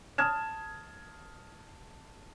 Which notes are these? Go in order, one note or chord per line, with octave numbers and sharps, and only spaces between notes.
A5 D#6 F6 G#6 E7